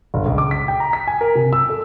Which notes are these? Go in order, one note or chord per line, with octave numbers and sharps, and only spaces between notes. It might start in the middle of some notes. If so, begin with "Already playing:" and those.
G1
C#2
D6
B6
G5
A#5
B6
G#5
A#4
C3
E6
A4